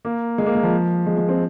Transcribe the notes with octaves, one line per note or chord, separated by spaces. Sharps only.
A#3
G#3
A#3
G#3
F3
G#3
G#3
C4